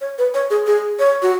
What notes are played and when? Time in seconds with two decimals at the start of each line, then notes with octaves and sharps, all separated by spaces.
0.01 C#5
0.18 B4
0.34 C#5
0.50 G#4
0.67 G#4
0.99 C#5
1.22 F#4